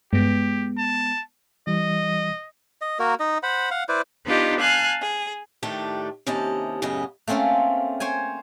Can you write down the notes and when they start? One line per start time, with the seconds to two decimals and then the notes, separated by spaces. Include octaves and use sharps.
0.13 G2 G#3 B3 G4
0.78 A5
1.67 E3 G3 D#5
2.82 D#5
2.99 A#3 F#4 A#4
3.20 D#4 D#5
3.43 C5 F#5 B5
3.71 F5 F#5
3.89 E4 B4 C5 D5
4.26 B3 D4 D#4 F4 G4 D#5
4.60 F5 G#5 A5 F#6
5.01 G#4
5.63 A2 D#3 A3 D4 G4
6.27 D#2 C3 C#4 E4 D#5 A5
6.82 F#2 A2 C#3 B3 D#5 G#5
7.27 A3 A#3 C4 C#4 F4
8.00 C5 C#5 G5 G#5